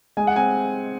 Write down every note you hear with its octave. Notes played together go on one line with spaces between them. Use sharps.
G#3 G#5
F#5
C4 G#5